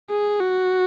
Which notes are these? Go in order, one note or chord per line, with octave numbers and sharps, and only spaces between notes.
G#4
F#4